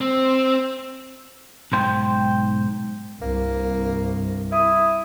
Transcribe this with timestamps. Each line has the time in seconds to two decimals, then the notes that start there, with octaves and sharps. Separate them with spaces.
0.01 C4
1.72 B1 G#2 C5 G5
3.22 C2 G2 A#3
4.52 E4 D#6